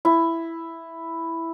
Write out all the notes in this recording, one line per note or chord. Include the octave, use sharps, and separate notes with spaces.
E4